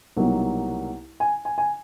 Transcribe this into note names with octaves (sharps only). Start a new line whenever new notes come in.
C2 B2 F#3 A#3 D#4
G#5
G#5
G#5